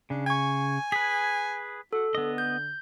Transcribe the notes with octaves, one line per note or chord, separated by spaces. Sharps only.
C#3 D4
G#5 C#6 G#6
G#4 B4 B6
F#4 A4
D3 B3 D#5
G6